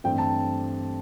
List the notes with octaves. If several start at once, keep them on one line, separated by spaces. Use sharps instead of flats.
G2 E3 A3 C4 G5
A5